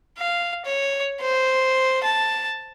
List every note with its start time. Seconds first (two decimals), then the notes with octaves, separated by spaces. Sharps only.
0.18 F5
0.65 C#5
1.21 C5
2.04 A5